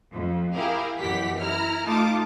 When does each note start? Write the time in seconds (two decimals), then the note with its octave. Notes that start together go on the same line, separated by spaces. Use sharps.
0.13 F2
0.54 E4 G4 G#4 A#4 F5
0.99 F#2 B2 E3 G4 F#5 B6
1.41 E4 A#5 F6
1.86 A3 D#4 F4 A5 D6